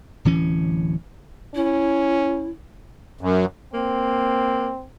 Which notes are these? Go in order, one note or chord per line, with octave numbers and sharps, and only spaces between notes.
D1 E3 C#4
C#4 E4
F#2
A#3 C4